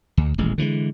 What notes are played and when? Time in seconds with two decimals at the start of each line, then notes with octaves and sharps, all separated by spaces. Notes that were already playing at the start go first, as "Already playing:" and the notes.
0.17 D2
0.38 D#1 A1 G#3
0.58 D3 E3 F3 G#3